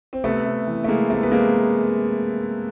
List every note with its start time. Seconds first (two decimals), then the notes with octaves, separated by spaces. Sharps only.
0.13 C4
0.24 C3 A3 B3
0.46 C3
0.67 E3
0.84 A3
0.88 E3 G#3 A#3
1.10 C3 A3
1.23 B3
1.31 C3 G#3 A#3